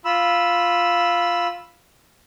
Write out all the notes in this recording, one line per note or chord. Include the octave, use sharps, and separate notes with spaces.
F4 B5 E6